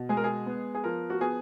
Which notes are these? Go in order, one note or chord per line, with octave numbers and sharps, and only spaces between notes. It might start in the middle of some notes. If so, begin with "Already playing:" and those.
Already playing: B2
G#3 G#4
A#4
G#4
B3
G#4
F3 A#4
F#4
B3 G#4